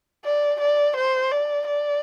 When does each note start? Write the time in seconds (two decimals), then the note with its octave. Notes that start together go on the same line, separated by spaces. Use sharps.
0.25 D5
0.61 D5
0.97 C5
1.32 D5
1.67 D5